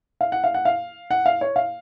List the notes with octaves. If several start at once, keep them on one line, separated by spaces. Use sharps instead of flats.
F5
F#5
F5
F#5
F5
F#5
F5
C#5
F5